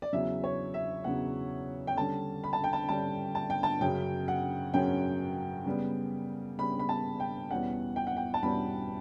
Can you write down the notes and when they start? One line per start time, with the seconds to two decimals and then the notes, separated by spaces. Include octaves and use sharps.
0.02 D5
0.13 E2 C#3 F#3 E5
0.44 C#5
0.74 E5
1.04 E2 C#3 F#3 F#5
1.87 G5
1.97 D3 G3 C#4 A5
2.44 B5
2.53 A5
2.64 G5
2.73 A5
2.89 D3 G3 C#4 A5
3.35 A5
3.50 G5
3.63 A5
3.81 F#2 C#3 F#3 C#4 G5
4.28 F#5
4.74 F#2 C#3 F#3 C#4 G5
5.66 C#3 G3 B3
6.58 C#3 G3 B3 B5
6.79 B5
6.89 A5
7.20 G5
7.50 E2 B2 G3 C#4 F#5
7.96 G5
8.07 F#5
8.17 G5
8.34 A5
8.43 E2 B2 G3 C#4 B5